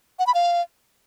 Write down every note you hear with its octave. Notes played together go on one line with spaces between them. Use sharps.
F#5
B5
F5